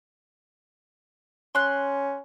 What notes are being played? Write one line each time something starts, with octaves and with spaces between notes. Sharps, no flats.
C#4 C6 F#6